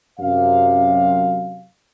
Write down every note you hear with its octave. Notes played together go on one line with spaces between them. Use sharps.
F#2 C3 F5